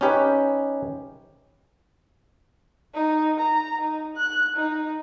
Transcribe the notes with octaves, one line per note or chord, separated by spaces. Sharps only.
C#4 D#4 G4 B4 C#5
D#4
A#5
D#4
F#6
D#4